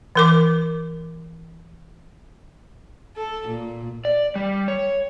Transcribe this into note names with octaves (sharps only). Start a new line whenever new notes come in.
E3 A#4 D6
A4
A#2
D5
G3
C#5